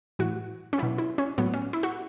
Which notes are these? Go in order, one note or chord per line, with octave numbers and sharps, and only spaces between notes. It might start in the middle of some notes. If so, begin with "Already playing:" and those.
A2 E3 F#4
C#4
B2 F#3 E4
E4
C#4
A2 F#3 B3
C#4
E4
F#4